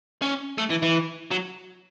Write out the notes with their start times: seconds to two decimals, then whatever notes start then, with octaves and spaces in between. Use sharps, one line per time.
0.22 C#4
0.58 A3
0.70 E3
0.82 E3
1.31 F#3